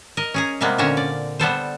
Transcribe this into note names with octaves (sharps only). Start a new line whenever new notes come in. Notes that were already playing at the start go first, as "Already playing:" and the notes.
A#4 D#5
C#4 G#4 A#5
C3 G3 G#3 A#3 B3
A#2 D3 C4 C#4 E5 A#5
D5
G3 B3 A4 C5